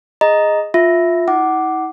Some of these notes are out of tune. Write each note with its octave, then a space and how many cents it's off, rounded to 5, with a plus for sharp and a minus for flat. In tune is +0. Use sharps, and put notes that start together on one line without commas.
G#4 -5 D#5 +0 A#5 +0
F4 +10 E5 +0
E4 -45 F#5 +20 D6 +0